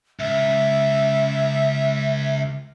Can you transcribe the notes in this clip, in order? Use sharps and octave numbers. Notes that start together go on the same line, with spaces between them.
C#2 E5